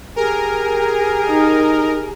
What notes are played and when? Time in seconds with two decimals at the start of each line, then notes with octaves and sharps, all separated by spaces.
0.16 G4 G#4 A#4 G#5
1.29 D#4